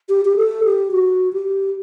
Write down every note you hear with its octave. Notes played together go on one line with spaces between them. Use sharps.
G4
G4
A4
G4
F#4
G4